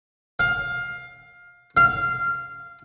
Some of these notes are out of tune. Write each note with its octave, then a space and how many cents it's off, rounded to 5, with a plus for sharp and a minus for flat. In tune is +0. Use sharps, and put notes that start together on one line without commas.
F5 +15
F5 -15